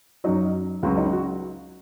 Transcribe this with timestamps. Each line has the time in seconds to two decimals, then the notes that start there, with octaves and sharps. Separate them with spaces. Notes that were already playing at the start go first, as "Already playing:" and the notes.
0.24 F#2 F#3 D#4
0.83 C#2 C#3 F#3 F#4
0.97 D#4
1.13 F#4